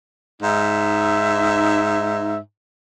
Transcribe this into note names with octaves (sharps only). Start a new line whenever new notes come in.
G#2 D#4 E5